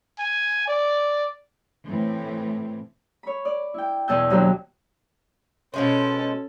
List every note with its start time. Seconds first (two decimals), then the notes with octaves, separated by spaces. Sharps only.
0.19 G#5
0.68 D5
1.87 A2 E3 C4
3.23 C#5 B5
3.45 D5
3.74 E4 G5
4.08 E2 B2 G#5 A5 E6 G6
4.30 D#2 F#3 D4 G5
5.74 B2 G#3 C#4 A4 C5